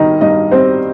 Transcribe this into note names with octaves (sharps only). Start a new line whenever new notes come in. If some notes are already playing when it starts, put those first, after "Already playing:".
Already playing: G2 D#3 D#4 D#5
G2 D#4 D#5
G3 C4 C5